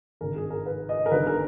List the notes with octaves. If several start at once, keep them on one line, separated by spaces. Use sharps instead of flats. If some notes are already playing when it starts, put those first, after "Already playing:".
G#1 G2 D#3 A#4
G#4
A#4
B4
D#5
A#4
G1 G2 D#3 B4
A#4